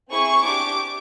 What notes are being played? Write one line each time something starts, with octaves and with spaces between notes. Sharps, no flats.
C4 E4 G#4 C#6
D4 G4 D6